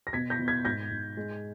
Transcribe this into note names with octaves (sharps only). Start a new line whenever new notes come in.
A#6
B2 G#6 B6
G6 A#6
B2
G#6 B6
G#2 G6 A#6
G#2
G#3